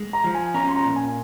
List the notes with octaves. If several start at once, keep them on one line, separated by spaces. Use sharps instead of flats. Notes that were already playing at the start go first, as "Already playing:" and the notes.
Already playing: G#3
A#5
F3
G#5
C#4 A#5
C6
A#5
A#2
G#5